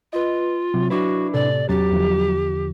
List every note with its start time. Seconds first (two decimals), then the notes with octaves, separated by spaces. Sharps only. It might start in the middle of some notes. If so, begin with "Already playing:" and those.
0.13 F4 B4 D#5
0.74 C3 F#3
0.90 D4 E4 F#4 B4
1.33 A2 C3 A4 D5
1.69 E2 F#3 C#4 G4 A6
1.91 E2 D3 F3